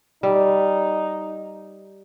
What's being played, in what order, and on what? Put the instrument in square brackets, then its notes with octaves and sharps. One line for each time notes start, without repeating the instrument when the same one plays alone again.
[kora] G3 [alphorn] D#4